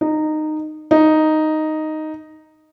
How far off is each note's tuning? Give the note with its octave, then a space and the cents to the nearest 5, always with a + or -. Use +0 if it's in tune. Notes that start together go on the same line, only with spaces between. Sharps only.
D#4 -15
D#4 +0